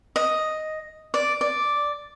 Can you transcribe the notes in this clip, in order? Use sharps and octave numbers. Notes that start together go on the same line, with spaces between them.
D#5
D5
D5